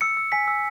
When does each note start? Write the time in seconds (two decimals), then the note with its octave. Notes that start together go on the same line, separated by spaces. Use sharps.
0.01 E6 C#7
0.17 E6
0.32 G#5 B6
0.48 E6